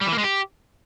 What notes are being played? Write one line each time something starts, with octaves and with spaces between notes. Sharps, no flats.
G3
E3
A#3
G#3
G4